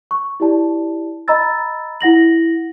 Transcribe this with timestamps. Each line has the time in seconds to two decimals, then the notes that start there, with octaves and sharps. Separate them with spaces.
0.11 C#6
0.40 E4 G4 D5 A5
1.28 D#5 A#5 B5 E6 A6
2.01 E4 F#5 A#6 F#7